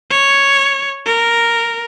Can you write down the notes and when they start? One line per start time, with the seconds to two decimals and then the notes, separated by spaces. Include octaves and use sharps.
0.11 C#5
1.05 A#4